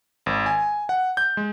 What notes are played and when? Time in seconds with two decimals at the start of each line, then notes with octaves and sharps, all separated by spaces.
0.26 G#1
0.46 G#5
0.89 F#5
1.17 G6
1.37 G#3